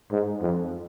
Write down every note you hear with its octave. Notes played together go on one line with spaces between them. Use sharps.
G#2
F2